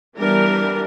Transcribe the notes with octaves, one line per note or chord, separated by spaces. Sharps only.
E3 G3 B3 D4 A#4